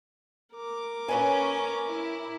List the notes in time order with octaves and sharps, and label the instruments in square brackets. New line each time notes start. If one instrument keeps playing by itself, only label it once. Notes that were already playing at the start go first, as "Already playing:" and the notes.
[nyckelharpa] A#4 D6
[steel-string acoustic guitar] A#2 B4 G#5 [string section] C#4
[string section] E4